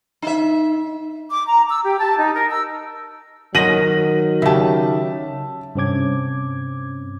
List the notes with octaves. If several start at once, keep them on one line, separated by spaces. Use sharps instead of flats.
D#4 E5
D6
A#5
E6
G4
A5
D#4
A#4
E6
D#3 F#3 F#4 D#5 A#6 D#7 F#7
C#3 G4 E5 A5
G2 C3 C4 C#4 D6 G#6